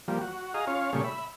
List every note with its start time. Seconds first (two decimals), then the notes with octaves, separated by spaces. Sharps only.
0.08 F3 G3 A#3
0.21 F#4
0.54 G#4 D#5 F5 A#5
0.67 C#4 F4 C#5 F5
0.93 A#2 C#3 G3 A3 G#4 C#5
1.04 E5 B5